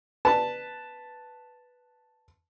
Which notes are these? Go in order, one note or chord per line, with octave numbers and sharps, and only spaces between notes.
B4 A5